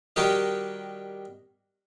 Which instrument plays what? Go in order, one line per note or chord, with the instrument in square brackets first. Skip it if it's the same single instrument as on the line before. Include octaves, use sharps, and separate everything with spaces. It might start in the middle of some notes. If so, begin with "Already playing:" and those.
[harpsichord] D#3 G3 F#4 G4 A#4 D#5